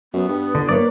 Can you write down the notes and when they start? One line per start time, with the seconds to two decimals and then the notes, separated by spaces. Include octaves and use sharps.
0.14 F#2 B3
0.28 G2
0.55 G1 D3
0.69 A#3 B4 C#5 D5